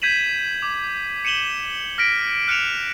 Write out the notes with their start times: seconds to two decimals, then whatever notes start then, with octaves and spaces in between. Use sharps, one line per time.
0.02 G6 G#6 B6 D#7 E7 F#7
0.62 D6
1.25 C#7 D#7 E7 F#7 G7
1.98 F6 A#6 B6 D7
2.48 F6 F#6 C#7 D7 E7 F7